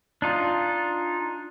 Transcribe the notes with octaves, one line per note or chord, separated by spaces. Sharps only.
D4 D#4 F4